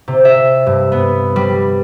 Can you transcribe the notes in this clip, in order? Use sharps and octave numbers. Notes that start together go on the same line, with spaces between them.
C3
E5
G2
B3
G3